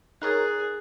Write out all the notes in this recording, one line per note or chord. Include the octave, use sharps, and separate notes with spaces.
D#4 G#4 A#4 C#5 F#6 A6